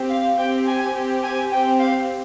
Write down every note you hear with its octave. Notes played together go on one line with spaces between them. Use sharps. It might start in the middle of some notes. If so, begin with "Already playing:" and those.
Already playing: C4 G4
F5
C4 G4 G5
G#5
C4 G4
G#5
C4 G4 G5
F5